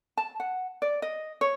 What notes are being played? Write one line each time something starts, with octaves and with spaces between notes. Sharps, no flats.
A5
F#5
D5
D#5
C#5